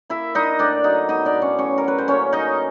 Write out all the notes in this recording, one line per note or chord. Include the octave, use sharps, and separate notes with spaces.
A#3 E4 E5
D4 D#4 D#5
A2 D4 D5
F#3 D#4 D#5
B3 D#4 D#5
D4 D5
A2
C#4 C#5
A2 C#4 C#5
A#4
F#3 B4
C5
A#3 C#4 C#5
C#4 D#4 D#5